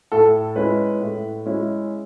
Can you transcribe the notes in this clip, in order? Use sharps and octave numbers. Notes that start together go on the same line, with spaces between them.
A2 A4
G#3 C#4 E4 B4
A2
G#3 C#4 E4